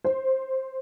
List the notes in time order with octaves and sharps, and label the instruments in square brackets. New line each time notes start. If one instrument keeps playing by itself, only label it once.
[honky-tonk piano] C5